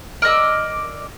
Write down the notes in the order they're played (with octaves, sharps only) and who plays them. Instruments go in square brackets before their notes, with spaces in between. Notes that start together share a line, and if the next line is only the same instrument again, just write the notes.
[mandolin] A#4 D5 D#5 E6